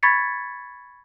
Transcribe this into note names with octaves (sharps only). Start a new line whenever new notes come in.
B5 C#6 G#6 A6 B6 C#7